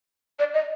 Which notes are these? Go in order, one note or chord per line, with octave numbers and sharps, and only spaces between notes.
D5
D#5